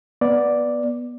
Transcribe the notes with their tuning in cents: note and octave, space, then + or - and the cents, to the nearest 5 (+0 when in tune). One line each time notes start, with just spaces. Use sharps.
B3 -15 D5 +0